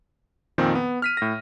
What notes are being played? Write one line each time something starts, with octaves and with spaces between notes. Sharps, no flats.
F2 A#2 D#3 F3 C4
B3
F6 B6 D#7
A2 A#6